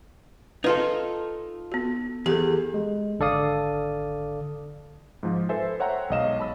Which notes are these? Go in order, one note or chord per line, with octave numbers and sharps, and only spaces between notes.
D#4 F4 A4 B4
B3 F#4
E2 G4 A4
G#3
G#1 D3 A4 D5 F5 D#6
G#2 F3
A4 B4 C5 E5 G#5
C5 C#5 E5 F#5 G5 A#5
B1 G#3 C#5 D#5 F5 E7
A5 B5 E6